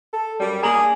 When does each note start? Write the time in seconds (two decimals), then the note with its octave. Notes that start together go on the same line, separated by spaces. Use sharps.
0.13 A4
0.40 F#2 G3
0.63 A#3 G#4 G#5 A#5 F#7
0.77 D4